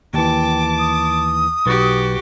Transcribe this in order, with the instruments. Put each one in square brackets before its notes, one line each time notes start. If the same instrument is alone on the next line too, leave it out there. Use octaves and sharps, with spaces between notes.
[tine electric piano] D#2 E3 [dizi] G5 [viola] A5 D6
[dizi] D#6
[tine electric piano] B1 B4 A6 [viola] F#4 G4